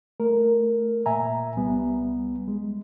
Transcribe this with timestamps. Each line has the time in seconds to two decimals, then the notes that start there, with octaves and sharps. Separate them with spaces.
0.20 A3 A#4
1.06 A#2 E5 G#5 A#5
1.56 C2 G3 B3
2.48 G#3